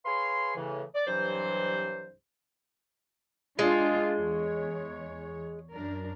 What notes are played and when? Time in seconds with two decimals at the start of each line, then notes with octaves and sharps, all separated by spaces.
0.05 G#4 B4 C#5 F5 C6
0.56 A2 C#3 E3
0.94 D5
1.07 C2 G2 E3 F#3 C5
3.59 G#3 D4 F4
4.15 E2 C#5
5.72 F#2 D4 A#4